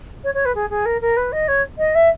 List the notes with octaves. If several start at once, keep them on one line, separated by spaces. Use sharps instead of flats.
C#5
C#5
B4
G#4
G#4
A#4
A#4
B4
D#5
C#5
D#5
E5